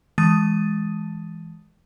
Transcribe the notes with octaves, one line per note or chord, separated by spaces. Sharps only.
E3 G#3 A5 D#6 A6 D#7